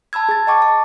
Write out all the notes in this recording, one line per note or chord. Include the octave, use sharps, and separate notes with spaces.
A5 B5 E6 G#6
G#4 A6
D#5 G5 A5 C#6 D6
A5